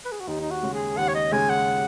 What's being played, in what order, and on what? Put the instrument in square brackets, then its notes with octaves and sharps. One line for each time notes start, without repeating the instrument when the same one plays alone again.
[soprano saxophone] B4
G#4
F#4
[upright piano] D#2 [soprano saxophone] D#4
[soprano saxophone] D#4
F#4
[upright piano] C#3 G#3
[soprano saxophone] G#4
[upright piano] D#2 [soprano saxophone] F#5
[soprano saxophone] C#5
D#5
[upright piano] C#3 G#3 [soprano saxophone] G#5
[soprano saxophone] F#5